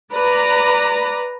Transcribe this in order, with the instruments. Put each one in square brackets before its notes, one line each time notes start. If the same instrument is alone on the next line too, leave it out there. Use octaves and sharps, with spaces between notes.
[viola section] B4 D5 A#5